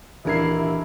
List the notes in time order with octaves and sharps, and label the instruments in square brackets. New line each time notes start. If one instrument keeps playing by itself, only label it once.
[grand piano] D#1 A#4 C7 [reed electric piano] E3 D4 G#6 [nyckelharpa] E4